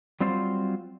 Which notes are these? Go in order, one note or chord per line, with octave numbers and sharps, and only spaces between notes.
F#3 G3 C4 F4 C5